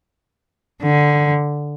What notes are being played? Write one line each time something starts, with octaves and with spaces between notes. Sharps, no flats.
D3